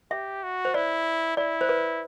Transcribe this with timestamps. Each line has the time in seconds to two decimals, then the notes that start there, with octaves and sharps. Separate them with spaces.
0.11 G4 E5
0.43 F#4
0.65 C5
0.74 E4 D5
1.37 E4 D5
1.61 C5
1.69 B4